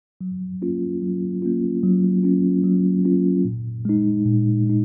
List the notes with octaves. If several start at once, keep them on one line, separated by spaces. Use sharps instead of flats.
F#3
A#3 C#4 F4
F#3
A#3 C#4 F4
F#3
A#3 C#4 F4
F#3
A#3 C#4 F4
A#2
G#3 D#4
A#2
G#3 D#4